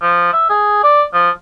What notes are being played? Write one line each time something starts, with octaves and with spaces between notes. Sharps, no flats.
F3
E5
G#4
D5
F3